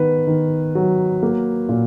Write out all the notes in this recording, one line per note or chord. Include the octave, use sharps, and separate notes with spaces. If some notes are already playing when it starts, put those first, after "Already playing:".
Already playing: D#3 B3 B4
D#3
F#3
A#3
A#2